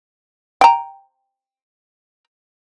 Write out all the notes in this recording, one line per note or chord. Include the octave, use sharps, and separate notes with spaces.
G5 A#5